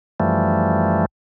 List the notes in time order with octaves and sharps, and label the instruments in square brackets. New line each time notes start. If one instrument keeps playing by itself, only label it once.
[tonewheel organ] F#2 E3 F3 G3 A3